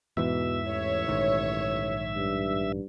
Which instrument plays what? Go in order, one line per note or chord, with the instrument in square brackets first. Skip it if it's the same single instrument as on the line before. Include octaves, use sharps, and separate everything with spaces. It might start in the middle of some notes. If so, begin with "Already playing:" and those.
[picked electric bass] E2 G#2 E3 [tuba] B2 [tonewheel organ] E5
[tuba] A1 [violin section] C#5
[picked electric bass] A#1 G#2 D#3
[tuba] G2